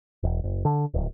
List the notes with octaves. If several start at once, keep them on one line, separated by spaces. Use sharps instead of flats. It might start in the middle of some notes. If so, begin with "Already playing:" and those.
E1
F#1
D3
D1